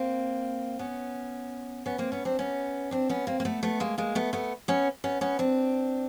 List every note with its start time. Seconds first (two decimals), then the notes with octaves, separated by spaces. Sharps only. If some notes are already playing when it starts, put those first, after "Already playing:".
Already playing: A#3 C4
0.79 B3 C#4
1.86 B3 C#4
1.98 A#3 C4
2.12 B3 C#4
2.25 C4 D4
2.39 B3 C#4
2.91 C4 D4
3.09 B3 C#4
3.27 A#3 C4
3.40 A#3
3.45 A3 B3
3.63 A3 B3
3.80 G#3 A#3
3.98 G#3 A#3
4.15 A3 B3
4.33 A3 B3
4.68 B3 C#4
5.04 B3 C#4
5.21 B3 C#4
5.39 C4 D4